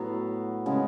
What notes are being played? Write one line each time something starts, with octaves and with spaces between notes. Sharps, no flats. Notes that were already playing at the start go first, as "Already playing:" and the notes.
Already playing: A2 F#3 B3
C#3 G#3 B3